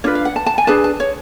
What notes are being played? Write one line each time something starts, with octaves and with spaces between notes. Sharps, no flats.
D4 F4 B4 C#5
F5
F#5
A5
A5
G#5
D4 G#4 B4 A5
A5
C#5